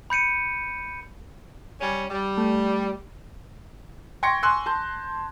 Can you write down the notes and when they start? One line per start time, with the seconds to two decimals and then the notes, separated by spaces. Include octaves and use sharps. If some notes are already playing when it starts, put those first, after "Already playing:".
0.10 B5 G6 C#7 D#7
1.80 G3 C#4
2.10 G3
2.38 A3
4.23 G5 C6 C#6 G#6 A#6 C#7
4.43 G#5 C6 C#6 E6 F#6
4.66 A5 C6 G6